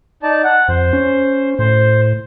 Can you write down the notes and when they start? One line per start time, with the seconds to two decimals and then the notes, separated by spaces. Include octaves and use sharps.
0.23 D#4 D5 A5
0.44 F#5
0.68 F2 C5
0.93 C#4
1.59 A2 C5